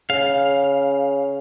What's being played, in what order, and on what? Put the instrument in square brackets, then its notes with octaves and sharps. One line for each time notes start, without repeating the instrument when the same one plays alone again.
[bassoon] C#3 [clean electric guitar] F5